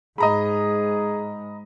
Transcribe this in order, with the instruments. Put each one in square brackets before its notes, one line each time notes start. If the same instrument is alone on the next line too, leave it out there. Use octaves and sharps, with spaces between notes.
[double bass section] G#2 [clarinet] G#4 [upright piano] D#5 A#5 B5